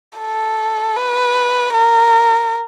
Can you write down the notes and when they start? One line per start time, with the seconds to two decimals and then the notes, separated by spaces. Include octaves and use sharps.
0.18 A4
0.96 B4
1.74 A#4